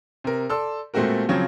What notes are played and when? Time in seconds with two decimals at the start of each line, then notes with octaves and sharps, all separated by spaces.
0.24 C3 A#4
0.49 A4 D5 C6 E6
0.94 A#2 G#3 A3 C4 F#4 A#4
1.29 C#3 F3 F#3 C4 C#5